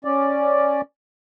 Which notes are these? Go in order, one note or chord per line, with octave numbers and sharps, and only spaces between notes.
C#4 D5